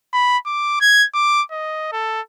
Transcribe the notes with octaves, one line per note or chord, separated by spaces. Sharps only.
B5
D6
G#6
D6
D#5
A4